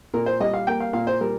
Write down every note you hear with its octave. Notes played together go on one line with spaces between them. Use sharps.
A#2 A#4
C5
G3 D#5
F5
A#3 G5
F5
A#2 F5
C5
G3 A#4